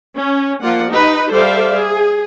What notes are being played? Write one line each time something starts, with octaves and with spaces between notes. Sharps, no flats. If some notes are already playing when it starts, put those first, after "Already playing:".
C#4
F3 A#3 F4 D5 F#5
D#4 G4 B4
G3 A4 C5 D5 E5 F5
G#4